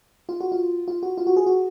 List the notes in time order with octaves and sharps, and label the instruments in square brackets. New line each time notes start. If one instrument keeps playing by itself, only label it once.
[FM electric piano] F4
F#4
F4
F4
F#4
F4
F#4
G#4
F#4